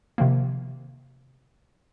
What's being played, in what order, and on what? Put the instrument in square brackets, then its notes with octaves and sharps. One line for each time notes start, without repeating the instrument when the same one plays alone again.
[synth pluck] C3 D#3 F3 A#3